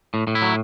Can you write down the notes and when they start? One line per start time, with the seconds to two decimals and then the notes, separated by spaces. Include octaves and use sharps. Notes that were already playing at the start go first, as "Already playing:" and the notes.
0.14 A2
0.27 A2
0.35 E4
0.42 F#3